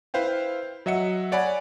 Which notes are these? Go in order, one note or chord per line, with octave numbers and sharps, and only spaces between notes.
E4 B4 C5 F5 G5
F#3 D#5 E5 F#5 C#7
C#5 D5 F#5 G#5 B5